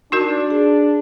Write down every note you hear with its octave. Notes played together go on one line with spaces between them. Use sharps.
D4 D#4 F#4 A#4
G#4